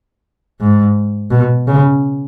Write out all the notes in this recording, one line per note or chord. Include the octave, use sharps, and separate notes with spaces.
G#2
B2
C#3